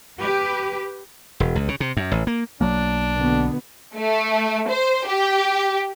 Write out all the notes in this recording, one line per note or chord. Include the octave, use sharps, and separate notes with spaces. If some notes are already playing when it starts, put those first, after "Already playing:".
G4 B4
E1
C#2
C#3
C3
F#2
A1
A#3
B1 F#3 A#3 D4
B2 D3 B3
A3
C5
G4